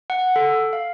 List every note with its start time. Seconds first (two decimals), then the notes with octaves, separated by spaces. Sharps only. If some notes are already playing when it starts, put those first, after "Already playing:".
0.10 F#5
0.36 A4
0.73 F5